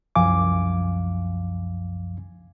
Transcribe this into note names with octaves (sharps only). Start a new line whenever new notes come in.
C2 F#2 F3 F5 G#5 D6